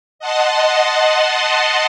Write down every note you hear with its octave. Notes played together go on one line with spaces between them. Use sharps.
D#5 F#5 A5 C6